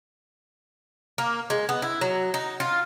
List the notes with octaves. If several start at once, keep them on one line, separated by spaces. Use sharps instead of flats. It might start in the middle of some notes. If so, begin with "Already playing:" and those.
A#3
G#3
B3
E4
F#3
D#4
F4